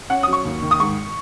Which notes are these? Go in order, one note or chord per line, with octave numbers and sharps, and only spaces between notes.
C#4 F#5
F#3 D#6
C#6
D#2
D#3
D#6
G#2 C#6